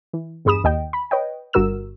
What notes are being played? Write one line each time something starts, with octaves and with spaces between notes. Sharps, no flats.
E3
E2 G2 G#4 B5 D#6 E7
D#2 D#5 G5
B5
B4 C#5 D#5 G5
G1 G2 F#4 A#4 E6 E7